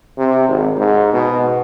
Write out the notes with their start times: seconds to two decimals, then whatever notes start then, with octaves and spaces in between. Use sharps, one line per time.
0.18 C3
0.48 G#1
0.78 G#2
1.13 B2